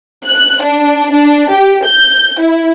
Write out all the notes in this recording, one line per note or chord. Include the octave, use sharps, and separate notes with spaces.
F#6
D4
D4
G4
G6
E4